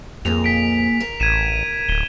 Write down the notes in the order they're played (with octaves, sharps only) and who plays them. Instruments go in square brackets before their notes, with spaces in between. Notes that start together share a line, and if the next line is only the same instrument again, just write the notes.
[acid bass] F2 [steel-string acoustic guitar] A#2 A#3 G#4 [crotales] F7
[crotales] B6 D7
[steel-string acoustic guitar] A#4
[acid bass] A1 [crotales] G#6 D#7 E7
[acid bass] D1 [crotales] G7